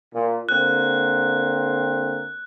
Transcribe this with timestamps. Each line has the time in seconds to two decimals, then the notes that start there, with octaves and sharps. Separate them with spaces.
0.14 A#2
0.49 D3 A#3 C4 F#6